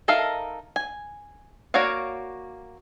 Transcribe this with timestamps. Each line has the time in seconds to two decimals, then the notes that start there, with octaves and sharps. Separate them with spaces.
0.08 D#4 A4 A#4 E5 F5
0.76 G#5
1.74 A#3 F#4 C#5 D5 F5